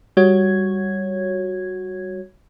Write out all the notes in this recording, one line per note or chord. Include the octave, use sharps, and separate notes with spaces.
G3 F#4 C#5 G#6